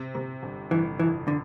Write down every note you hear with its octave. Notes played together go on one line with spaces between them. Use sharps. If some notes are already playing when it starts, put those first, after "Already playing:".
Already playing: C3
C3
G1
G1 E3
F2 E3
D3